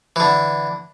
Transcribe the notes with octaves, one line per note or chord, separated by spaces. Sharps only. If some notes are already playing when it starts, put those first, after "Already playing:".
D3 E3